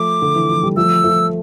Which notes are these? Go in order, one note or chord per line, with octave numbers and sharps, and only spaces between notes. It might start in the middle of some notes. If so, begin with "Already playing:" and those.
Already playing: F3 A3 D6
D3
E3
F3
G3
F3 A3 E6
F3 A3